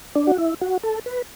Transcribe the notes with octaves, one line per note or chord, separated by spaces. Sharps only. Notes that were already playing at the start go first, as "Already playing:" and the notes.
D4
F#4
E4
F#4
A4
B4